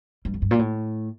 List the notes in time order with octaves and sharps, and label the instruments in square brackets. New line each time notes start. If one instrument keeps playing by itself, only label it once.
[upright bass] G2
F2
G2
A#2
A2